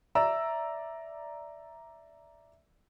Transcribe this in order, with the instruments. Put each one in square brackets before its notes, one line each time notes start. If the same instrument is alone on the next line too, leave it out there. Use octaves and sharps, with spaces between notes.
[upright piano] D5 A#5 E6 [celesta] E5